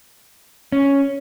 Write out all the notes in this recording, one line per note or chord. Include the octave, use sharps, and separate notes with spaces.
C#4